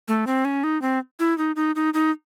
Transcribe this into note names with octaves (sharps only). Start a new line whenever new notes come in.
A3
C4
C#4
D#4
C4
E4
D#4
D#4
D#4
D#4